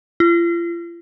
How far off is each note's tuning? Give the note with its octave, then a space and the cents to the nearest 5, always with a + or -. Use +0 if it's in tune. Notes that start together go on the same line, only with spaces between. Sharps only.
F4 -40